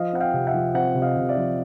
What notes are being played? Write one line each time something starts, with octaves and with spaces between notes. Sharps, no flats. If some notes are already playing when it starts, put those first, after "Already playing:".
Already playing: F3 D#5 F5
C4 F#5
F5 G5
C3
E5 F#5
F3
C4 E5 F#5
C3
D#5 F5
C3
D5 E5
F3